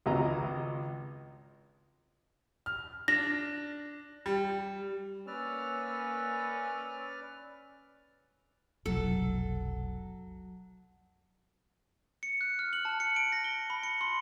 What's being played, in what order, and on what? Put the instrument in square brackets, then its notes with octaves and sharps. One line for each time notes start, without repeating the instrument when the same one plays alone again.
[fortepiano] G#1 C#2 G#3 D#5 A#5
[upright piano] F6
[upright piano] D4 [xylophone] A#6
[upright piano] G3
[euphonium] A#3 [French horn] C#4 [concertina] B4 D5 F6 [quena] E6
[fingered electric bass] F1 [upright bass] B1 [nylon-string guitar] F#3 [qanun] A4
[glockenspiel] C#7
F#6
F6
F#7
A5
C#7
D7
A#6
G7
B5
C#7
C6